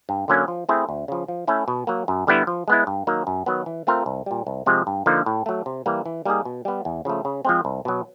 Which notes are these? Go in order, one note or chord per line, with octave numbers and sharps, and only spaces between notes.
G2
D3 F#3 A#3 C#4
F3
A3 C4 E4 G#4
D2
C#3 F3
F3
A3 C#4 E4
B2
F#3 A#3
F#2
D3 G3 B3 E4
F3
G#3 B3 E4
G2
D#3 F#3 A#3 D#4
F#2
D#3 F#3 B3
E3
A3 C4 F4 A#4
C2
A#2 G3
C2
C3 F3 G#3 C4
G2
D3 F3 A#3 D#4
A2
F#3 A3
C3
E3 G3 A#3
E3
G3 A#3 D#4 G#4
B2
G3 B3
E2
C#3 F3 A3
C#3
F3 G#3 C4
C2
B2 F#3